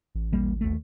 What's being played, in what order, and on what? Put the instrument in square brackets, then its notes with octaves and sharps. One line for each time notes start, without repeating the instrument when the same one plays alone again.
[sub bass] A1
[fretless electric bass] D#1 G3 A#3
D#2 A3